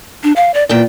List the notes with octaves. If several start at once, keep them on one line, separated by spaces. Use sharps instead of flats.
D4
F5
D5
E2 A#2 D5 G5